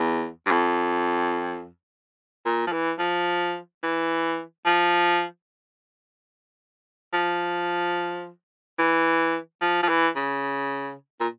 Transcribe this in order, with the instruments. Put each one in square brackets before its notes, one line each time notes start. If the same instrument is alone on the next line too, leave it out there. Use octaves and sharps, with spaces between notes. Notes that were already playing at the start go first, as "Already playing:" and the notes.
Already playing: [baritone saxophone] E2
G2
F2
A#2
F3
E3
F3
E3
F3
F3
E3
F3
F3
E3
C#3
A#2